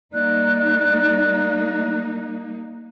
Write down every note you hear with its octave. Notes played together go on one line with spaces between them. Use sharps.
G3 A#3 D#4 D5 F#6